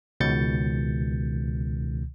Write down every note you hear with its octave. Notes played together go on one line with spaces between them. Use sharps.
C#2 B2 D#3 G6 A6 C#7